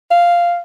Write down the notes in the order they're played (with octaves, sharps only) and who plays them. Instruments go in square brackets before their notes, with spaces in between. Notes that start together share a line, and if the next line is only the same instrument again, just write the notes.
[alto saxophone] F5